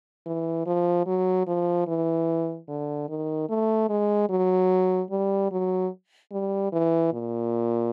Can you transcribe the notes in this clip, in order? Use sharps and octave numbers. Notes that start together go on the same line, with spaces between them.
E3
F3
F#3
F3
E3
D3
D#3
A3
G#3
F#3
G3
F#3
G3
E3
A#2